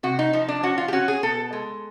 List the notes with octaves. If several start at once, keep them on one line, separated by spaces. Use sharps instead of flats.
C3 F#4
D#4
F3 D#4
D4
C#4 F#4
F4
G4
C#4 F#4
G#4
B2 A4
G#3